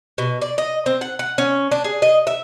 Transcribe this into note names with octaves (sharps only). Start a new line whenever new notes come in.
B2
D5
D#5
C4
F#5
F#5
C#4
D4
G#4
D#5
E5